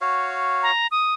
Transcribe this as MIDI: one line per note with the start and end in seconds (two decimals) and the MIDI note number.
0.01 0.71 66
0.01 0.71 73
0.01 0.71 77
0.63 0.87 82
0.91 1.14 87